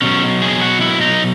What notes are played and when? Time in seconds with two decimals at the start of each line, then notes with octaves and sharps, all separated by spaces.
0.02 B2 F#3 C#4
0.41 G#4
0.61 F#4
0.81 E4
1.01 D#4